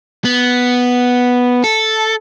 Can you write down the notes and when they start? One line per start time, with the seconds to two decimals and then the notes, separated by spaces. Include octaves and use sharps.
0.25 B3
1.64 A4